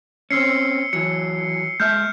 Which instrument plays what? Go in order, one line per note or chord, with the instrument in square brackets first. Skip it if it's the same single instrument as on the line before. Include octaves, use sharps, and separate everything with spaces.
[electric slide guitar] C4 C#4 [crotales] E6 C7 C#7
[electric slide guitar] E3 F#3 [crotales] C#7
[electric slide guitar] G#3 E5 [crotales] F6 G6